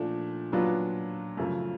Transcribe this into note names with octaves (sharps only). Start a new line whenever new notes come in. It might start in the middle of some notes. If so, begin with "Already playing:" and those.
Already playing: A#2 F3 A3 D4
A#2 F#3 B3 D4 F4
F#2 C#3 F3 A3